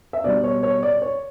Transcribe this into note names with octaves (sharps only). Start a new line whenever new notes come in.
E5
B2 G3 D5
C#5
C#5
D5
C#5